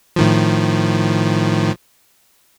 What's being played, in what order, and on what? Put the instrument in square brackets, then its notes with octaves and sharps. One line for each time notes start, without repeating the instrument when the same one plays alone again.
[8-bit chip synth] A2 D#3 F3